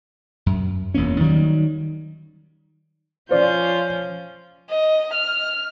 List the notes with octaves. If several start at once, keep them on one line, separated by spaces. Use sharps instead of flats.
F#2
E1 E2 A#3 C#4
D#3 F#3 G3
F3 C#4 F4 C5 D5 G6
D#5
F6